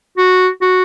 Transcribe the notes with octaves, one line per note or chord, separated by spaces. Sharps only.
F#4
F#4